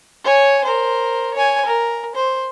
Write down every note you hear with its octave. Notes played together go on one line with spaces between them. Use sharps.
C#5 G#5
A#4 C5
C#5 G#5
A#4
C5